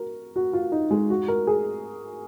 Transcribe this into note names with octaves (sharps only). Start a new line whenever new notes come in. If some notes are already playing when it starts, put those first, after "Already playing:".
Already playing: F#4 A#4
F#4
F4
D#4
G#3
F#4
A#4
G#4